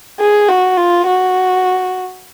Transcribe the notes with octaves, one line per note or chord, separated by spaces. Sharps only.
G#4
F#4
F4
F#4